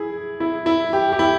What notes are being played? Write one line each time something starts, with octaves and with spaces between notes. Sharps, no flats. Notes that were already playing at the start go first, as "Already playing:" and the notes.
Already playing: E4 G#4
E4
E4
G4
G4
E4